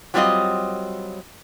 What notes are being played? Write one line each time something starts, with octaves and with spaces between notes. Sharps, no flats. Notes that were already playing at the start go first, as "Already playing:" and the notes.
F#3 G3 C4 F4 D#5